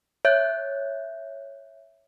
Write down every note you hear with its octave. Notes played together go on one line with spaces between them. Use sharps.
C#5 E5 F#6 G6